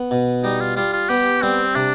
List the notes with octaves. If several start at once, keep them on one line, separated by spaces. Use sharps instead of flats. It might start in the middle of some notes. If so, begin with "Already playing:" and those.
Already playing: B3
B2
G3 D#4
F4
G3 F4
F4
B3 G4
G3 C4
C3 D4